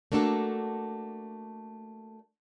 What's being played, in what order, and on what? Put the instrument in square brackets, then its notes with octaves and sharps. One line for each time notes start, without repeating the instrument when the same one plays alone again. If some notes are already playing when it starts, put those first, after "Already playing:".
[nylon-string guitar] A3 A#3 D4 F#4 A4